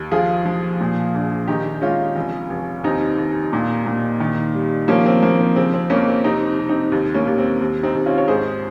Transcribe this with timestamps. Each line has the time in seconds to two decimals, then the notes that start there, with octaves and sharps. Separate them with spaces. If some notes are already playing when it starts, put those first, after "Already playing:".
Already playing: D#2
0.11 F3 F4 G#4
0.45 F3
0.81 A#2
1.14 A#1
1.47 D#3 D#4 G4
1.82 G#3 C#4 F4
2.16 F1
2.50 F1
2.84 D#2 C4 D#4
3.18 D#2
3.53 A#2
3.86 A#2
4.20 D#3
4.54 G3
4.88 F3 A#3 C#4
5.06 C4
5.23 F3 A#3
5.40 C4
5.56 C#3 C4
5.74 C4
5.90 F2 A#3 C#4
6.08 C4
6.24 C3 C4 D#4
6.59 C3
6.69 C4 D#4
6.92 D#2
7.14 A#3 C#4
7.27 D#2
7.38 C4
7.61 D#2
7.83 C4 D#4
7.95 D#2
8.06 C#4 F4
8.18 C#5
8.28 G#2 G#4 C5